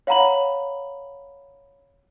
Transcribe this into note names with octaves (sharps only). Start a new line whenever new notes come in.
C#5 F5 F#5 A#5 B5 F#7